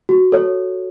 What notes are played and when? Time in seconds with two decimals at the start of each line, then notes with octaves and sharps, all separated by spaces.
0.09 F#4
0.32 A4 C#5